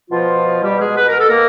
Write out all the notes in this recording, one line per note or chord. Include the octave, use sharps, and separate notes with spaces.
B2 F3 F4
G3 G4
G#3 G#4
B4
A#4
A4
A#3 A#4